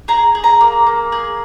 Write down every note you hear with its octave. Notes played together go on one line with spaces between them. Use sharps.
G#4 A#5
G#4
A#5
A#3
A#3
G#4